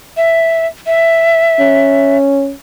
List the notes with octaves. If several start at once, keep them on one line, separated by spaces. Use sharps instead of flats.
E5
E5
C#4